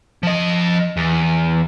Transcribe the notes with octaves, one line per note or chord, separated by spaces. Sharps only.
F3 D#5
E2